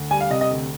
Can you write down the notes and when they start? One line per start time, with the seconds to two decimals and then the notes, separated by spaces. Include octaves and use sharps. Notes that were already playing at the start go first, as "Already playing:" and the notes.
Already playing: D2
0.11 G3 G#5
0.21 F5
0.30 C3 D#5
0.41 D#5
0.51 D2